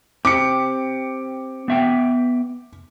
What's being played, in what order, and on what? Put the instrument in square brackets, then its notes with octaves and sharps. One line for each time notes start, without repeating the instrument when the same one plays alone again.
[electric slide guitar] C4 G4 [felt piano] D6 C#7
[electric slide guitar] B3 E5 G5